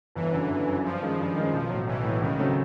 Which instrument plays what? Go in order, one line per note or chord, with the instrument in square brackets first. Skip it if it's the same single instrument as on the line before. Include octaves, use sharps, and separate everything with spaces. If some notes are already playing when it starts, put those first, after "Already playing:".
[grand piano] G1 [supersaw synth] E3
[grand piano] F#2 D3 F#3
G1
F#2 D3 F#3
[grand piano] G2 [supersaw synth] F3
[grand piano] D#3 G#3 C#4
G2
D#3 G#3 C#4
B1
A2 F#3
[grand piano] B1 [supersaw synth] E3
[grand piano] A2 F#3
[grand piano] C#2 [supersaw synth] D#3
[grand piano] C#3 F#3 A3 C4